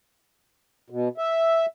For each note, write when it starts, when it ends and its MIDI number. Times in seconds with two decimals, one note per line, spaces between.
0.90 1.08 47
1.18 1.66 76